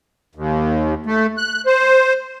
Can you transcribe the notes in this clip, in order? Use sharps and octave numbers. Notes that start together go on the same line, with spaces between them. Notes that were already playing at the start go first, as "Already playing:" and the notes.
D#2
A3
F#6
C5